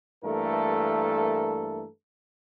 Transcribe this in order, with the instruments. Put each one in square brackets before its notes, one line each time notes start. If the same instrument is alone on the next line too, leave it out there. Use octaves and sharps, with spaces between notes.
[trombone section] G2 E3 A3 A#3 A4 A#4